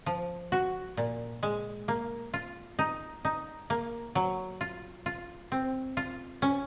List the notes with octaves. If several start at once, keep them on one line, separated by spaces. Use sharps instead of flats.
F3
F#4
A#2
G#3
A#3
F4
D#4
D#4
A#3
F#3
F4
F4
C4
F4
C#4